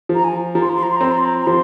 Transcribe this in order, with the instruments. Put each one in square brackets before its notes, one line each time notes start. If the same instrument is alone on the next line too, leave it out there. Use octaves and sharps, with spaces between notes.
[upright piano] F3
[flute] A#5
G#5
[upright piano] F3 [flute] A#5
[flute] C6
A#5
C6
A#5
C6
A#5
[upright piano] C4 [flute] C6
[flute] A#5
C6
A#5
A#5
[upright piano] F3 [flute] C6